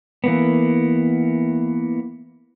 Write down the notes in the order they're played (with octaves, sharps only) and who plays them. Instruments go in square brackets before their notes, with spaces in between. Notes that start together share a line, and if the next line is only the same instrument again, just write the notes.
[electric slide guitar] E3 A#3 B3